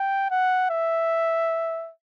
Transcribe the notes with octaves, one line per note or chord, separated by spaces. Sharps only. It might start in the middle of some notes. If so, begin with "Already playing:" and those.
Already playing: G5
F#5
E5